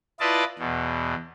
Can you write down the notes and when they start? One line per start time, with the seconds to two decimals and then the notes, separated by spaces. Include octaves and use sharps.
0.20 E4 F4 B4 D5 D#5 A5
0.59 E2 B2